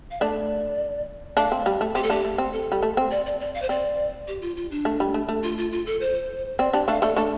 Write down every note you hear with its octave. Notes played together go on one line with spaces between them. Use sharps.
F5
A3 D4 D5
A3 D4 F5
C4
G3
A3
C4 G4
A4
A3 D4 G4
A3
C4
A4
G3
A3
C4
D5
D5
D5
F5
C5
C4 D5
G4
F4
F4
D4
A3
G3
A3
A3
F4
F4
F4
A4
C5
C4 D5
D4 G4 D5
A3 D4 F5
A3 D4 A4
A3 D4 A4